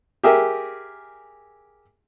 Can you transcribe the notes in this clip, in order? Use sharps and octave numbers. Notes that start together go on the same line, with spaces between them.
G4 G#4 A#4 E5